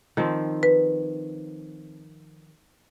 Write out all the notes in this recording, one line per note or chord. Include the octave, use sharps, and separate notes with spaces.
D#3 F3 C4
B4